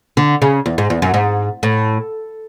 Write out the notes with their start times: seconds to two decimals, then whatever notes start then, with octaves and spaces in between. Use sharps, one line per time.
0.17 D3
0.42 C#3
0.66 E2
0.78 G#2
0.90 E2
1.02 F#2
1.14 G#2
1.63 A2